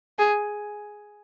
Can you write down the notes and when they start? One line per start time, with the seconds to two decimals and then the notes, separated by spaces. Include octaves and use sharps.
0.19 G#4